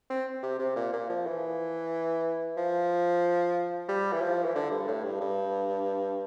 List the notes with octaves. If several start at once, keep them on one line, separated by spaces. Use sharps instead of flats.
C4
C3
C3
A#2
A#2
F3
E3
F3
G3
E3
F3
E3
D3
G2
A2
G2
G2